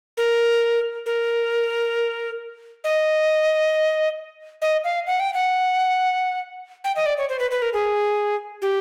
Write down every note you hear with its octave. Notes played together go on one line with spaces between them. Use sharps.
A#4
A#4
D#5
D#5
F5
F#5
G5
F#5
G5
D#5
D5
C#5
C5
B4
B4
A#4
G#4
G4